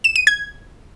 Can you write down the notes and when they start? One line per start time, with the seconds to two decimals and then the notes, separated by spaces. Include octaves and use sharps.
0.04 E7
0.16 D#7
0.27 G#6